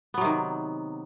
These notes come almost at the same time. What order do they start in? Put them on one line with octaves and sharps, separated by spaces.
B3 F#3 C3 D#3